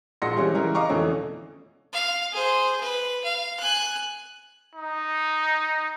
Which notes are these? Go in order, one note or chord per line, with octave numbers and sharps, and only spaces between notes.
A#1 G#3 F#5 C6 A#6 C#7
E3 G3 G#3 C4 C#4
C#3 E3 A#4
D#5 F5 A#5 C#6 D6
F2 B2 D3 E3 A3 C#4
F5
G#4 C5
B4
F5
G#5 F#6
D#4